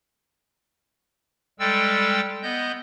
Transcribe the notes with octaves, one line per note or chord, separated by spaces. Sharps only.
G3 G#3 A4 G5 E6 A6
B3 D#5 G6